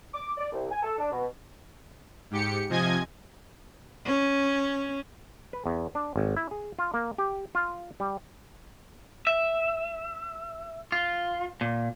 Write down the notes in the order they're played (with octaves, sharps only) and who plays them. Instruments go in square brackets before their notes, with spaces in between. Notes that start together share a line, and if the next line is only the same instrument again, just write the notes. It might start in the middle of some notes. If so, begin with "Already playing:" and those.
[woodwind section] D6
D5
C2
G#5
A4
D4
B2
[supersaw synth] G#2 G4 C#7
C3 F3 D#5 G#5 G#6
[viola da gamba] C#4
[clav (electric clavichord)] B4
E2
D4
G#1
E4
G#4
F4
A#3
G4
F4
G3
[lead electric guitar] E5
F4
A#2